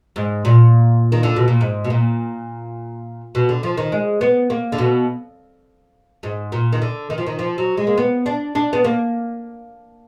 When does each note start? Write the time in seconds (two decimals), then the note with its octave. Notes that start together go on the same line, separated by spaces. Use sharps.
0.16 G#2
0.45 A#2
1.12 D#3
1.23 D3
1.36 B2
1.48 A#2
1.61 G#2
1.84 B2
1.90 A#2
3.35 B2
3.49 D3
3.63 F3
3.77 D#3
3.92 G#3
4.21 B3
4.50 A#3
4.72 D3
4.78 B2
6.23 G#2
6.52 A#2
6.73 D#3
6.82 D3
7.10 D#3
7.18 F3
7.27 D#3
7.39 F3
7.58 F#3
7.77 G#3
7.87 A#3
7.97 B3
8.26 D4
8.55 D4
8.73 B3
8.84 A#3